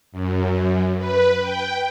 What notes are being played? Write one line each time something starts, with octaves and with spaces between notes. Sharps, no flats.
F#2
B4
G5